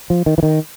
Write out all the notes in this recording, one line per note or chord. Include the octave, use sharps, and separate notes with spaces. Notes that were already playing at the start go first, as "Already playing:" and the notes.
F3
D#3
E3
D#3